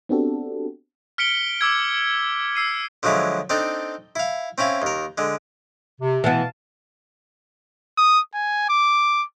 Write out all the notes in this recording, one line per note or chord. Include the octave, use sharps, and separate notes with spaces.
B3 C4 D4 F#4 G4 A4
F6 B6 C#7 D7 G7
D6 E6 G#6
E6 C7 D#7
D3 F3 F#3 G#3 E4
C4 D4 D#4 A4
E4 F5
C4 C#4 E4 F5
D#2 A#4
D3 G#3
C3
B2 E3 B3 F5 A5
D#6
G#5
D6